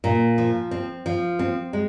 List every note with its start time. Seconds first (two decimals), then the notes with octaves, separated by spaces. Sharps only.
0.04 A#2
0.38 F3
0.71 C4
1.06 F3
1.39 C4
1.73 G#3